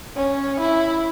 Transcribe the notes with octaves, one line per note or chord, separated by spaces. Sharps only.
C#4
E4